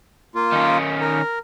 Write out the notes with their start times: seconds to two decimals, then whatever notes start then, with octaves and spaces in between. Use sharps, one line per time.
0.35 A#3 F4
0.52 D#3 C#4
1.01 A#4